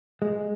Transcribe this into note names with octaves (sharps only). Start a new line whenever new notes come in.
G#3